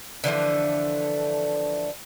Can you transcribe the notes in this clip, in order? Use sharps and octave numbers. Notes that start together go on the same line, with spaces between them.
D3 E3 F3 A3